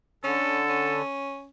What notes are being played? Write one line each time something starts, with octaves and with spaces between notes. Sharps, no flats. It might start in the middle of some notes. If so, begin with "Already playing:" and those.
D3 C#4 A4
C#4